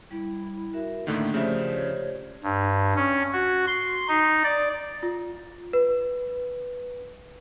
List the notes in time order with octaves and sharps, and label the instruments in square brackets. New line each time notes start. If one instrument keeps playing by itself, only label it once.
[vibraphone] G3 [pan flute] E4
[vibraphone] F#4 A#4 E5
[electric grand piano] A2 D3 D#3 [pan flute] A3 [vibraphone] A#3 D4
[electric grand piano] C#3 F3 E5 [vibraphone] G4 C5 D5
[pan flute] C#5
[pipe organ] G2
C#4
F#4
C6
D#4
D5
[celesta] F4
B4